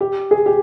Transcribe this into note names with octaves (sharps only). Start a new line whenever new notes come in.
G4
G#4
G4